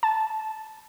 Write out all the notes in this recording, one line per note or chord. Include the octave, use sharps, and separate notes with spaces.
A5